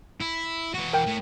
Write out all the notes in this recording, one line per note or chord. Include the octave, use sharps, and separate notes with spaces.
E4
E3 F#4
A#4 G5 G6
A2